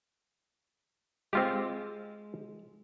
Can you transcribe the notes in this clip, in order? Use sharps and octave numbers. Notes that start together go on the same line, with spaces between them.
G#3 C4 F4 G4